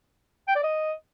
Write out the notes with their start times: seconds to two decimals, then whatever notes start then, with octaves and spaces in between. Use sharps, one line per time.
0.48 G5
0.56 D5
0.64 D#5